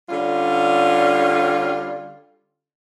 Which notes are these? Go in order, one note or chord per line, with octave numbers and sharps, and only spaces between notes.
D3 G3 C#4 F4